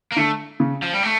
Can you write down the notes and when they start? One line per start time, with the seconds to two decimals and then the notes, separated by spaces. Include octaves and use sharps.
0.12 A#3
0.16 D3 A3
0.60 C#3
0.82 F3
0.93 G3
1.03 A3